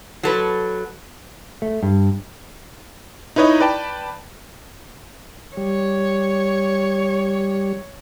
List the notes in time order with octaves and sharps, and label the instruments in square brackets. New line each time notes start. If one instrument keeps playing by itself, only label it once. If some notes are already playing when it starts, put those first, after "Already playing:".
[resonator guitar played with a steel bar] F#3 A4 B4
[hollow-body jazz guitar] A3
G2
[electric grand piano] D#4 E4 B4 C#5 D#5
B4 D5 G5 A5
[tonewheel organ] G3 [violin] C#5